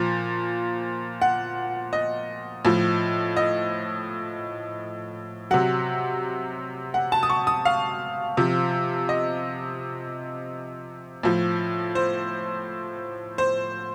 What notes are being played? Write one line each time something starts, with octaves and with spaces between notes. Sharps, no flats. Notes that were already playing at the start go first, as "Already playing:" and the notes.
Already playing: A#2 F3
F#5
D#5
A2 F3
D#5
C3 F#3 F#5
F#5
A5
D#6
C#6
D#6
F5
C3 F3
D#5
A2 F3
C5
C5